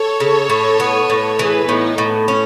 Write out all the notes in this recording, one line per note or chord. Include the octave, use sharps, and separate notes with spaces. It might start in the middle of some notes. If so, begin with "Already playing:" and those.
Already playing: A4 C#5
C#3
A2
B3
A2
E3 G#4 B4
A2 B3 D#4
A2 B3
C#4